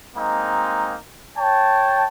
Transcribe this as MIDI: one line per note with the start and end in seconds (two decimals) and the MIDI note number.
0.16 0.95 56
0.16 0.95 58
0.16 0.95 60
0.16 0.95 63
1.37 2.06 73
1.37 2.06 79
1.37 2.06 81